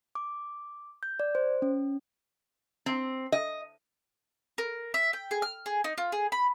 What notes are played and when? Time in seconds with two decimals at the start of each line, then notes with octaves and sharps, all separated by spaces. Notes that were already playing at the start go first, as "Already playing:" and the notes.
0.15 D6
1.03 G6
1.20 D5
1.35 C5
1.62 C#4
2.86 C4
3.32 D#5
4.58 A#4
4.94 E5
5.13 G5
5.31 G#4
5.42 F6
5.66 G#4
5.84 D#4
5.98 F4
6.12 G#4
6.32 B5